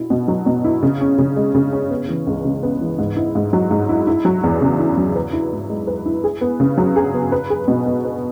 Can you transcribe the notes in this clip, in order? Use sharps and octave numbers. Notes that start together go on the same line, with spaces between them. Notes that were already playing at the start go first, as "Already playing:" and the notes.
Already playing: B2 E4
B2
F#3
B2
E4
C#3
C#4
C#3
G#3
C#3
C#4
B3
E3
C#2
C#3
B3
E3
G#2
E4
G#2
F#3
G#2
E4
E4
F#3
E2
C#3
E4
F#3
B4
E4
G#2
G#3
B4
E4
G#4
B3
C#3
F#3
G#4
B3
B4
G#4
B2
B3
B4